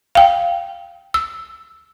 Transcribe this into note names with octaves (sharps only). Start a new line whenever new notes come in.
F5 G5
E6